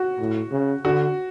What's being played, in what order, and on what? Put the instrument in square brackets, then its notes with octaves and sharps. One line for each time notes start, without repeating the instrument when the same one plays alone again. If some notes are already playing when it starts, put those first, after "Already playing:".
Already playing: [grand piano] F#4
[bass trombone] A2
C#3
[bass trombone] D3 [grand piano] F#4